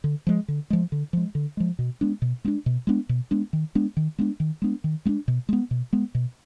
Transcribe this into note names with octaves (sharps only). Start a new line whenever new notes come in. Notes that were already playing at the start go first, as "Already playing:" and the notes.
D3
F3 G#3
D3
F3 G#3
D3
F3 G#3
D3
F3 G#3
B2
G#3 B3 D4
B2
G#3 B3 D4
B2
G#3 B3 D4
B2
G#3 B3 D4
D#3
G#3 B3 D4
D#3
G#3 B3 D4
D#3
G#3 B3 D4
D#3
G#3 B3 D4
B2
G#3 B3
B2
G#3 B3
B2